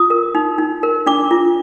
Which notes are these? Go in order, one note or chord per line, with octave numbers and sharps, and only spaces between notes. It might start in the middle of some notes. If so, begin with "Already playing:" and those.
Already playing: F4 D#6
A#4
D#4
D#4
A#4
D4 D6
F4